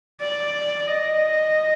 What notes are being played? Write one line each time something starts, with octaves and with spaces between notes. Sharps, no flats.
D5
D#5